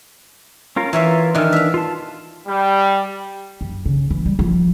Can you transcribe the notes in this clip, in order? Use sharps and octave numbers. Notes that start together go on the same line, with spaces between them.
C#4 F4 A#4
E3 F4 A#4 C#5 E5
D#3 E3 D4 F6
E5 F5
F4 A5
G3
F#2
C#3
E3
G3
F3